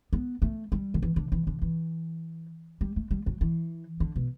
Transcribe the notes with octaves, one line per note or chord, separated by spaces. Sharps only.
B3
A3
G3
D3
E3
D3
E3
D3
E3
G3
A3
G3
F#3
E3
D3
B2